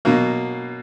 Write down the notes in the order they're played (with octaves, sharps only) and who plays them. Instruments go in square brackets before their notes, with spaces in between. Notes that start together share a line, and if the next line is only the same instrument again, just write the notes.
[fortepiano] B2 F#3 A#3